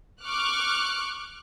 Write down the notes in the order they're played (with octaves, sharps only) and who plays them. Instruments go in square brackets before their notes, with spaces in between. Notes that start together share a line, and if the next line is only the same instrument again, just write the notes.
[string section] C#6 D6 F6 F#6